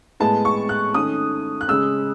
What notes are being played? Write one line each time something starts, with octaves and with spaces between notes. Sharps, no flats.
A2 G#3 B3 A5
C#6
F#6
D#3 A3 C#4 D#6
F#6
C#3 G#3 C#4 E6